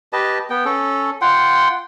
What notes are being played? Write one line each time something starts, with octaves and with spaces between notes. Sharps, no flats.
G4 B4 D#5 A5
B3 G5
C#4 A4
F4 F#5 G5 C6